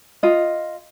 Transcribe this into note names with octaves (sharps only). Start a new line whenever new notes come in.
F4 D#5